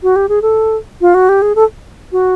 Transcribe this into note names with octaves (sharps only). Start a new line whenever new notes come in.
F#4
G4
G#4
A4
F4
F#4
G4
G#4
A4
F#4